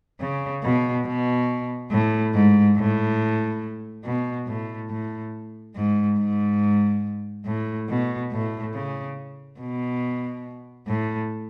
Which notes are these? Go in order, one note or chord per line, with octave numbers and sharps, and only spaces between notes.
C#3
B2
B2
A2
G#2
A2
B2
A2
A2
G#2
G#2
A2
B2
A2
C#3
B2
A2